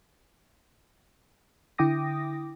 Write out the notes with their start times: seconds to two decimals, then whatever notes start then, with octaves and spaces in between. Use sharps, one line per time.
1.78 D3 E4 G5 D6 D#6 A#6